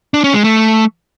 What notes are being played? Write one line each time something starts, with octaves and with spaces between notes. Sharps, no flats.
D4
C#4
G#3
A3